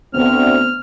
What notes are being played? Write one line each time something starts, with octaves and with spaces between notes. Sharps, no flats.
D2 D3 B3 C4 F6